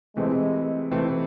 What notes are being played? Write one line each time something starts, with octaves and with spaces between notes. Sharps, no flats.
C3 E3 G#3 A3 C4
C3 E3 A3 C4